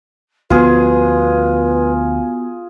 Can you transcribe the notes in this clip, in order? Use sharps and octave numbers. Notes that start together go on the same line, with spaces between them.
D2 F3 B3 F4 F#4 G#4 B4